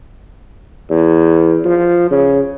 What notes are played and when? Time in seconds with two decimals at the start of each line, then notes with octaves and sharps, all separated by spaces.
0.90 E2
1.64 F3
2.11 C#3